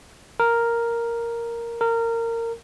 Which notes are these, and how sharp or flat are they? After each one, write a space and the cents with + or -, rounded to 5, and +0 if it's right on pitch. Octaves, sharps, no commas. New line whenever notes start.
A#4 +0
A#4 -20